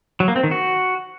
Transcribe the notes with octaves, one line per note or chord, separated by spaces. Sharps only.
F#3
A#3
C4
D#3
F#4